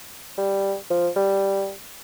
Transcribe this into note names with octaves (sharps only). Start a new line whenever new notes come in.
G3
F3
G3